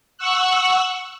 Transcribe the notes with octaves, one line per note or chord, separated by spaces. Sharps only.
F#5 C#6 E6 F#6